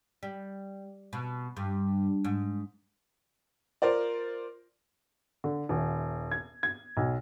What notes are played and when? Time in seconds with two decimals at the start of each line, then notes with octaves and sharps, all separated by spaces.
0.23 G3
1.13 B2
1.57 G2
2.24 G#2
3.82 F4 A#4 C5 D5
5.44 D3
5.69 D#1
6.31 G#6
6.63 G#6
6.97 B1